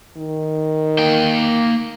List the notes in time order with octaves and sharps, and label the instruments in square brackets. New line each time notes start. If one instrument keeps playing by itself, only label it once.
[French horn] D#3
[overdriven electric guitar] A#3 G5